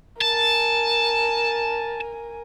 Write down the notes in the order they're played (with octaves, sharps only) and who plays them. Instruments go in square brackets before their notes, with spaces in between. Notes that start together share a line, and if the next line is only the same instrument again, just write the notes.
[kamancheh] A#4 G#5 [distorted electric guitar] A5